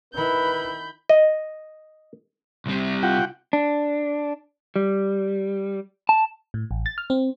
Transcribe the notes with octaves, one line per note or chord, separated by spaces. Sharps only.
D#3 E4 B4 B5 G6
D#5
C2 C3
F4 F#5 G5
D4
G3
A5
A2
A1
A6
F6
C4